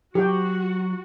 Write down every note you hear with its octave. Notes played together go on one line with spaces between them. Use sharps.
F#3 F#4 G4 G5